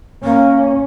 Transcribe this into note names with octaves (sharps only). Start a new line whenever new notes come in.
A#3 C#4